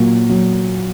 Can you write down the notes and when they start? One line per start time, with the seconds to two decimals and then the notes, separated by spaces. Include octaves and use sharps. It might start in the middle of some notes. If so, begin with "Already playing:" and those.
Already playing: A#2 F#3
0.29 F#3